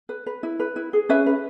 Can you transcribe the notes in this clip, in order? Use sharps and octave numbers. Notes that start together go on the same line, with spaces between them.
B4
B4
E4
B4
E4
G#4
C#4 B4 E5
B4